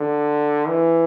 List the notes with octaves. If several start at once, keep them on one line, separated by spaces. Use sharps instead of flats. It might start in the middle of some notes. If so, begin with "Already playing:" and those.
Already playing: D3
E3